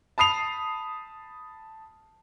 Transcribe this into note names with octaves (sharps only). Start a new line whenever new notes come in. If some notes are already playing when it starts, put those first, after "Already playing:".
A5 B5 D#6 C7 F7